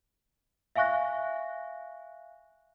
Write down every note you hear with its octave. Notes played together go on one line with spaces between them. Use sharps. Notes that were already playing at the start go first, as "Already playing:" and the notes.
E5 F5 G#5 C#6 F#6 A#6